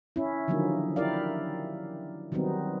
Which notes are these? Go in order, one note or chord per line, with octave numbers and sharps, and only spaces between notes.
C#4 E4
D3 D#3 F3 F#3 A#3 D#4
E4 G4 A#4 D5 F5
D#3 F#3 G3 B3 C4 D#4